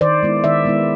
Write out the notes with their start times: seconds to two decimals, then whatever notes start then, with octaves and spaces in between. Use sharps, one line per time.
0.01 D#3 C5 D5
0.23 G#3 B3 E4
0.44 D#3 D5 E5
0.65 G#3 B3 E4